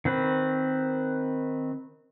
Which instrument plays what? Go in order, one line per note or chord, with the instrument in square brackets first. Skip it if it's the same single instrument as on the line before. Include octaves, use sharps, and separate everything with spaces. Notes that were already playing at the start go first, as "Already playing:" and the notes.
[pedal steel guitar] D#3 C4 B4